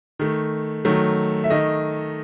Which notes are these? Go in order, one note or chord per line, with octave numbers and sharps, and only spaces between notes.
D#3 A3
D#3 F#3 A3
E5
D#3 A3 D#5